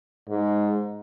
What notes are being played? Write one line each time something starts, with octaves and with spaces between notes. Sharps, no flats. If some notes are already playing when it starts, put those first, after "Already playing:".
G#2